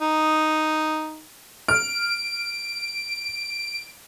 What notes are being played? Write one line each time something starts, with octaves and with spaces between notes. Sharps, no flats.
D#4
F6 D7